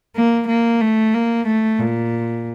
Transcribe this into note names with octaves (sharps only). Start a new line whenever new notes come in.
A#3
A#3
A3
A#3
A3
A#2